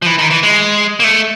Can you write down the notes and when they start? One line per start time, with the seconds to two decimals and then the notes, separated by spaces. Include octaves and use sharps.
0.02 F3
0.06 E3
0.18 D#3
0.30 E3
0.43 G#3
1.00 A#3
1.04 A3